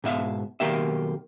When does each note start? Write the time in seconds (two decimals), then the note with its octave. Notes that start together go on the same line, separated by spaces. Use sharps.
0.04 G#2 B2 E5 F5
0.60 B1 D#3 A#3 G4 E5